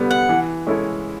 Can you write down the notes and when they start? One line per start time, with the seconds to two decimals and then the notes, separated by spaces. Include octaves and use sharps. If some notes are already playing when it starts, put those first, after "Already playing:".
Already playing: D3 G3 B3
0.11 F#5
0.29 E3
0.67 G#3 C#4 E4 A4